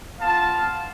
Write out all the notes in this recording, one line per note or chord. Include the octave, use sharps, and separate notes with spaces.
B3 F4 F5 A5